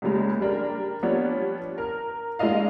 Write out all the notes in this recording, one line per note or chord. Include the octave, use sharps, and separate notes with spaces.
C#2 A#2 C#3 G3 G#3
G3 D4 A#4
F3 G3 B3 D4 C#5
A#4
G#3 D4 E4 D#5 F5